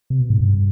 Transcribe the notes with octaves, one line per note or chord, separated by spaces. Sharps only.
C3
B2
G#2
G2